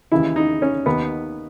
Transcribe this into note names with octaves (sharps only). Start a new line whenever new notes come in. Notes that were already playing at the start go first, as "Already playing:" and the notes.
D#2 C#3 E3 E4
D#4
C#4
D#2 D#3 B3